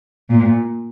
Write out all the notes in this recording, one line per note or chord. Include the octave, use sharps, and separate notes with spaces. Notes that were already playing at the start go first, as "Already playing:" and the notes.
A#2